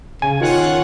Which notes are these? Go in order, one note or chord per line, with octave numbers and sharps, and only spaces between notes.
C#3 G#5
D#3 F4 C#5 F#5